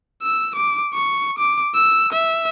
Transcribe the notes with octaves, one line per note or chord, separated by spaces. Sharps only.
E6
D6
C#6
D6
E6
E5